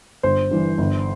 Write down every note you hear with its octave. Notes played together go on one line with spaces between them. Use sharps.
G1 C5
G2 E3
G1